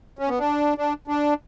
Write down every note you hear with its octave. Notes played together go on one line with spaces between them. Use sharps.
C#4
B3
D4
D4
D4